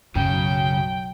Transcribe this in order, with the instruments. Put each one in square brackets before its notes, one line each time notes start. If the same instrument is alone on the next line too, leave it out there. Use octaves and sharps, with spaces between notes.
[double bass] B1 F#3 [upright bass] F#2 [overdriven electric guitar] C#3 [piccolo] G5